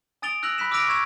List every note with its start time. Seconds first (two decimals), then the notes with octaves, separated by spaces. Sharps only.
0.22 G#5 D#6 A6 D7 F7 G7
0.43 E6 F#6 A#6 F7 F#7
0.58 B5 F#6 B6 E7
0.71 D6 E6 F6 A#6 D7 F7
0.87 C#6 E6 G#6 E7